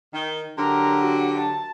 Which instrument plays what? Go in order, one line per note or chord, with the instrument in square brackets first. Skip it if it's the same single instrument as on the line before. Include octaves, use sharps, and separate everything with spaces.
[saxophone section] D#3
[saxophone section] D3 F#3 G4 [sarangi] A#4
[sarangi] F#4
A5